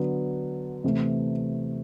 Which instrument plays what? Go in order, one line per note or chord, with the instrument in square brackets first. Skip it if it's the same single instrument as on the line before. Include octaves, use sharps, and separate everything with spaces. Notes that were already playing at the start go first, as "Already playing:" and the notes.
Already playing: [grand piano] D3 F#3 B3
C3 E3 A3